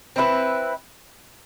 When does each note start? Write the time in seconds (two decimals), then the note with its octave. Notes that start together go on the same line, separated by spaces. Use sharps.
0.16 C4 E4 G#4 B4